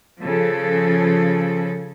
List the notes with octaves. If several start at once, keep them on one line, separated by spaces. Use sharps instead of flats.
C#3 F3 A4